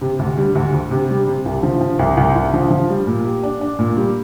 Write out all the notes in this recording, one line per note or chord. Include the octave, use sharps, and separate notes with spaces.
C3
D2
G3
D2
D2
C3
G3
C3
C2
F3
F3
C2
C2
C2
F3
F3
G3
A#2
G4
D4
D4
A#2
G3